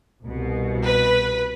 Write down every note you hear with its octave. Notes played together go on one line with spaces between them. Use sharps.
C2 B2
B4